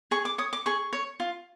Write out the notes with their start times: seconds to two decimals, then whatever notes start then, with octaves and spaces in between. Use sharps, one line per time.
0.11 G#4 C#6
0.25 D6
0.38 C#5 D#6
0.53 D6
0.66 G#4 C#6
0.93 C#5
1.20 F4